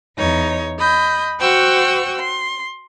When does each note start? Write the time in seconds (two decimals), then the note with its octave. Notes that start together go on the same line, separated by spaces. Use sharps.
0.16 E2 D#4 C#5
0.78 D#5 B5 G6
1.39 F#4 C5 F#5 G5 C#6 E6
2.18 C6